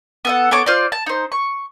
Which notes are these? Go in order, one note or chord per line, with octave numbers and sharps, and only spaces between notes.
B3 A4 F#5
B3 A4 C#5 D6
F4 C5 D5
A5
D#4 C5
C#6